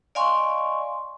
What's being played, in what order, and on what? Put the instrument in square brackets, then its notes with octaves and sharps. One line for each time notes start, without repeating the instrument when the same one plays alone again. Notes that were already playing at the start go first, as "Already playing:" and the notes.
[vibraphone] D5 D#5 F5 G#5 C6 C#6